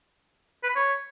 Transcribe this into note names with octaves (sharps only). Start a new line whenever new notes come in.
B4
B5
C#5